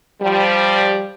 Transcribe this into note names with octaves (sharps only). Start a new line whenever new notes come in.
F3 G3